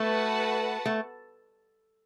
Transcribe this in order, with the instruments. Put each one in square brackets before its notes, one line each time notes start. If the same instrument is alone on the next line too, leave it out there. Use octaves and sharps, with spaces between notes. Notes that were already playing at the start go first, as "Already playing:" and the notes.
Already playing: [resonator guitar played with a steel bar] A3 [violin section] F#4 B4 F#5 A5
[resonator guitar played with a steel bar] A3